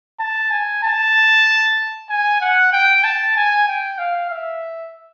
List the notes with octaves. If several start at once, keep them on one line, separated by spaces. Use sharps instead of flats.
A5
G#5
A5
G#5
F#5
G5
A5
G#5
G5
F5
E5